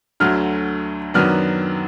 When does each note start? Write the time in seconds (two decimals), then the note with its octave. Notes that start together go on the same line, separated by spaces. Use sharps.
0.20 D2 D3 F#3 A3 F6
1.14 F#2 D#3 F#3 B3 D4 F6